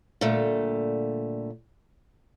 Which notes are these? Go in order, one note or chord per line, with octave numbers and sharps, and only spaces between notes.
A#2 D3 G3 A3